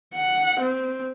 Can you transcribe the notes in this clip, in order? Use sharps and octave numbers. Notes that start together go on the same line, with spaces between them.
F#5
C4